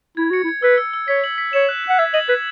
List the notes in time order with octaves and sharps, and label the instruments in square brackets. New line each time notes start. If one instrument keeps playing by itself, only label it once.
[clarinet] E4 [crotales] G#6
[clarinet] F#4 [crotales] C#7
[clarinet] E4
[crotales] G#6
[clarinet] B4 [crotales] E6
[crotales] E6
E6
[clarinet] C#5 [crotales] B6
[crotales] F#7
B6
[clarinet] C#5 [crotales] E7
[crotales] F#6
[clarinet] F#5 [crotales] F#6
[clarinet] E5 [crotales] G#6
[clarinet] D#5 [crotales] F#7
[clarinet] B4 [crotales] G#6